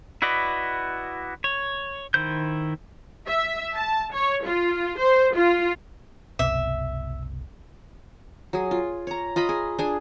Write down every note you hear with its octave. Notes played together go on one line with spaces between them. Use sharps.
E4 F#4 B4 D5 D#5
C#5
D#3 E4 C5 G6
E5
A5
C#5
F4
C5
F4
F#1 C2 B2 E5
F#3 G#4
F4
C#5 A#5
F4 D#5 A#5 B5
G#4
D4 G#4